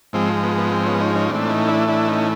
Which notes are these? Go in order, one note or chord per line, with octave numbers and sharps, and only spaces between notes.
G#2 F3 G#3 C4
B3
B3
C4
B3 C#4
C#4 D#4
C#4 D#4
A2 E3 A3 C4 D4
C#4 D#4
D4 E4
D4 E4
C#4 D#4